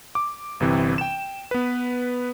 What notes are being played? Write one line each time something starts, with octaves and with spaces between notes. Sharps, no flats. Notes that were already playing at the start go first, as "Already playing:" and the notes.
D6
G1 C3 E3 C4
G5 E7
B3 B4